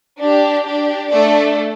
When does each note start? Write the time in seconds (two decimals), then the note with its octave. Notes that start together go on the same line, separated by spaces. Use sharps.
0.19 D4 G4
0.65 D4 G4
1.11 A3 D4 A4 D5